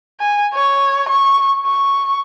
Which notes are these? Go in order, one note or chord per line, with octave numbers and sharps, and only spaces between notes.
G#5
C#5
C#6
C#6